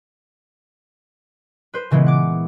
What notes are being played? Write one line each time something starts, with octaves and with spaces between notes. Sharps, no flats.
B4 C5
A#2 C#3 E3 G#3 B3
F#5 D6